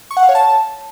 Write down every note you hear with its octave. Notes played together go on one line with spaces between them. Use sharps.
C#6
F#5
F5
C#5
A5